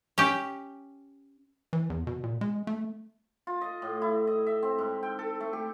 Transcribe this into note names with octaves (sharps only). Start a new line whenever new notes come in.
C#4 G4
E3
E2
B2
A#2
G#3
A3
F4
D#5
A2
E4
D#5
E5
C4
G#2
G5
A4
A3
G4